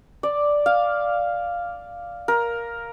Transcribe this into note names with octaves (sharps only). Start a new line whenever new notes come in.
D5
F5
A#4